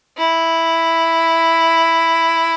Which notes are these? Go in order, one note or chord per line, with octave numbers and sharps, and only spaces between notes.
E4